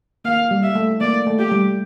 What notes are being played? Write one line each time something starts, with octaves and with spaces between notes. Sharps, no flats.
A#3 F5
G3
E5
A3
A#3 D5
A3
G4
G3